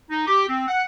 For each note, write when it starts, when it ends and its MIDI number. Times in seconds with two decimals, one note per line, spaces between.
0.10 0.24 63
0.27 0.44 67
0.48 0.67 60
0.68 0.83 78